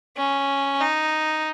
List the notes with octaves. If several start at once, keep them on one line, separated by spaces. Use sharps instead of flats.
C#4
D#4